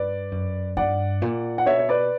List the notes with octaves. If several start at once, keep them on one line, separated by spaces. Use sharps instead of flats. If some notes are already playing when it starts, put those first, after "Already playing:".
Already playing: G2 B4 D5
F#2
G2 D5 F#5
A#2
F#5
B2 C#5 E5
C#5
B4 D5